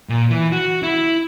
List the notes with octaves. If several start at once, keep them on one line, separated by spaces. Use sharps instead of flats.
A#2
E3
F#4
E4